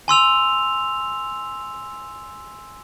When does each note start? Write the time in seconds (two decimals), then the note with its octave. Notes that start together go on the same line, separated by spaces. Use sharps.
0.08 G#5 C6 E6 F7